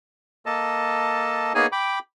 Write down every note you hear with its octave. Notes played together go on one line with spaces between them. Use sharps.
A#3 A4 D#5 A5
A#3 B3 D#4 G#4 C#5 G#5
G5 B5 D6